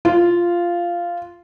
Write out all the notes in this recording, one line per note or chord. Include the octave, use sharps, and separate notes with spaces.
F4